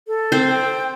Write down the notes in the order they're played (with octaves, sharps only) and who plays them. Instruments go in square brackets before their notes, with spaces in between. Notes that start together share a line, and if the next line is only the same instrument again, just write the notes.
[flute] A4
[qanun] C4 C5
[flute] G5